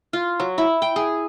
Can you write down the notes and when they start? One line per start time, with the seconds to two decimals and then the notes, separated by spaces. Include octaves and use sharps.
0.13 F4
0.40 F#3
0.58 E4
0.82 G5
0.96 G#4